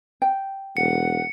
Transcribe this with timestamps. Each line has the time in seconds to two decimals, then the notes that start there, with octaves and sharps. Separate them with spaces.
0.22 G5
0.77 E1 F#5 C#7